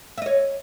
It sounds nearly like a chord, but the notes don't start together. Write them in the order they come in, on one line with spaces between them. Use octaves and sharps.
E5 D#5 C#5